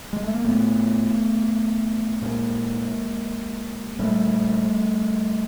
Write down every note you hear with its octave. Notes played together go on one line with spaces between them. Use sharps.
G#3
A3
A#3
A2 A3 B3
A#2 G#3 A#3
A#2 G3 A3